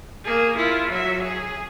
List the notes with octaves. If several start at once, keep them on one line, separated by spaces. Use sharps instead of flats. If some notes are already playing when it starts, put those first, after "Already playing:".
A#3 G#4
E4 F4
F#3 E5
G#4